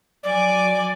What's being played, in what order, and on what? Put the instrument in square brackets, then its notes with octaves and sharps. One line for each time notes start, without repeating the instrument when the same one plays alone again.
[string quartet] F#3 G#5 D6 [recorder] D5